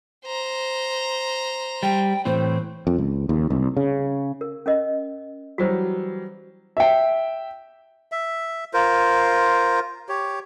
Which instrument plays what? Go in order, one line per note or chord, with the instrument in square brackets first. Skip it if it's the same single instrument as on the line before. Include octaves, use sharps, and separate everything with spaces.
[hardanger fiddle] C5 A#5
[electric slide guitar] G3 [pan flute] G5
[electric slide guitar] A2 E3 C4 [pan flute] C5
[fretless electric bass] F2
C#2
D#2
C2
C#3
[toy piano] A#4
C#4 A#4 D#5
[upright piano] E3 F#3 G3 [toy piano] F#4 C5
[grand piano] E5 G5
[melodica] E5
F4 A#4 C5
G4 C#5